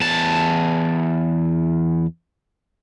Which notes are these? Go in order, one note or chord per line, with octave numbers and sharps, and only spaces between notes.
E2 A5